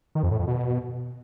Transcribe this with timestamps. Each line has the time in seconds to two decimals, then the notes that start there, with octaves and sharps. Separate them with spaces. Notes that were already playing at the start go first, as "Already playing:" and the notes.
0.15 D#3
0.23 F2
0.31 A2
0.39 F2
0.47 B2